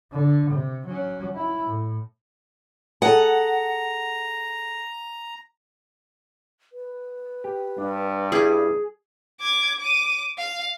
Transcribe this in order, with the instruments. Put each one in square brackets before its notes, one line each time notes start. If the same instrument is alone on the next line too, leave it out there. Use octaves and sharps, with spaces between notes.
[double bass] D3
C3
F#3 C#4
E4
A2
[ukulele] G#4 A4 [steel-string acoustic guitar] F#5 [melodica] A#5
[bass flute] B4
[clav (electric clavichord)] G4
[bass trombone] G2 [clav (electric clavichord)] D4
[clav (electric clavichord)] G3 E4 [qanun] G#4
[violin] D6 G#6
D6 D#7
F5